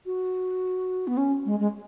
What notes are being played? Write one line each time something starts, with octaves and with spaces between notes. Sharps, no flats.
F#4
B3
C#4
G#3
G#3